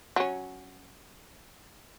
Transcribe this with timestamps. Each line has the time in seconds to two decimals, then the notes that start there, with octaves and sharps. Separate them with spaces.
0.16 F#3 C#4